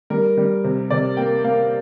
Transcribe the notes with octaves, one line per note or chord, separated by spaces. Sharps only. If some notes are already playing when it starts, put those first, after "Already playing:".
G3 A#4
G3
C3
C3 D5
A#3 G5
A#3 F5